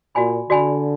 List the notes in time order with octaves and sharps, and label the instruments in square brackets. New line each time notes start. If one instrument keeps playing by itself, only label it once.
[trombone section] A#2 [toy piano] F#4 D5 G#5 B5
[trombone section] D3 [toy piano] F#4 D5 G#5 B5